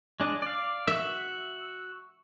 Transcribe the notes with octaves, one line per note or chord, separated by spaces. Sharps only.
G#3 D4 D#5
D5 F5
F#4 E5 E6